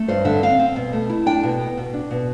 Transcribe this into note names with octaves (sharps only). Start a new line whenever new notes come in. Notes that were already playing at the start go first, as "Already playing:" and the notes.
Already playing: A3
G2 C5
D3 E5
C4 F5
C4
B2
A3
E4
D4 G5
B2
B3
B2
D4
B2